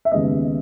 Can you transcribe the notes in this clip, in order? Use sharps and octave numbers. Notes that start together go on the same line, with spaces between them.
E5
D#2 C#3 G#3 B3 D#5